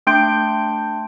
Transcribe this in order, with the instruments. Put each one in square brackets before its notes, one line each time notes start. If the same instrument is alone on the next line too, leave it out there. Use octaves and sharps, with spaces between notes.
[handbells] A3 D4 G5 C6 G6 D7